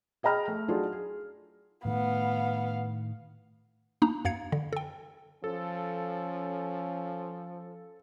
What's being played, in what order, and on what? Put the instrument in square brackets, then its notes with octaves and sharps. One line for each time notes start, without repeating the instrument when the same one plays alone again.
[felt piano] G#4 D#5 G5 A#5 F6
A3
F#3 D4 D#4 F4 G#4 A4
G#4
[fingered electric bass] A2 D#3 A3 [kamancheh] B3 F5
[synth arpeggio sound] A#3 D4 D#4 A#5
F#2 F5 G#6 C#7
D3
A4 G5
[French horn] F3 [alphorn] C#4 [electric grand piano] A4